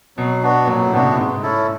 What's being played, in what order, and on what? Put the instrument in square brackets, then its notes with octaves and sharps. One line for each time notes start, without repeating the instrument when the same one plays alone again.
[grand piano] B2 [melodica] F#3
[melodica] B3 D4 F#4
[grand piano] A#2 [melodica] F#3
[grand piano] A2
[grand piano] C3 [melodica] B3 D4 F#4
[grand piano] C#3
C3
[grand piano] G#2 [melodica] G#3
[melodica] C#4 E4 A4